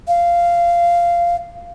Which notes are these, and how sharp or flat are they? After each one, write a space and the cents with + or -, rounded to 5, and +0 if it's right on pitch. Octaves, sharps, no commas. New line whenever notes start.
F5 -15